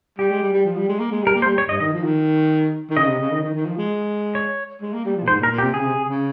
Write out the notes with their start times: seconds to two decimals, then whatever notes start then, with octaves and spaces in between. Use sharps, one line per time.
0.19 G3 G4
0.30 G#3
0.42 G3
0.53 G3
0.65 F3
0.77 G3
0.89 G#3
0.99 A#3
1.11 G#3
1.23 G3
1.27 A#4
1.35 A#3
1.42 C5
1.46 G3
1.58 C#5
1.69 G2 D#5
1.80 D#3 D#5
1.93 F3
2.04 D#3
2.90 D#3
2.97 C#3 D#5
3.07 C3
3.20 C#3
3.31 D#3
3.43 D#3
3.54 D#3
3.66 F3
3.78 G#3
4.35 C#5
4.82 G#3
4.93 A#3
5.05 G3
5.16 F3
5.23 A#2
5.28 G#2 C5
5.40 A#2
5.43 A#4
5.51 A#2
5.58 G4
5.62 C3
5.74 C#3 G#4
5.85 C3
6.09 C#3